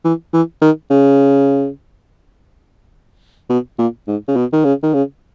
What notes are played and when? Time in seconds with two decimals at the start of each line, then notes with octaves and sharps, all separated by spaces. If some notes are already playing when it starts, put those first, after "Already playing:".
0.04 E3
0.33 E3
0.62 D#3
0.91 C#3
3.50 B2
3.79 A#2
4.07 G#2
4.28 C#3
4.36 B2
4.53 D#3
4.65 C#3
4.83 D#3
4.94 C#3